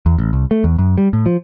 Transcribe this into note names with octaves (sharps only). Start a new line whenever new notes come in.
E2
A1
C2
A3
E2
F#2
G3
A2
F3